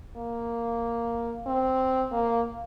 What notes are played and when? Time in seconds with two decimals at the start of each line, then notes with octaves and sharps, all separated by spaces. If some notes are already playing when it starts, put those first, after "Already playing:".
0.17 A#3
1.46 C4
2.12 A#3